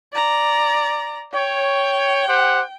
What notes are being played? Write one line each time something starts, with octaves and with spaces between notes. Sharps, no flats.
D5 A#5
C#5 G5
G4 C5 F#5